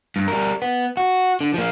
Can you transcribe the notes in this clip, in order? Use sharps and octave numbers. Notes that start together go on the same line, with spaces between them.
G2
G3 A#4
B3
F#4
D3
F3 A#3